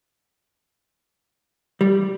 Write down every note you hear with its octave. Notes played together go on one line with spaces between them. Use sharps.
G3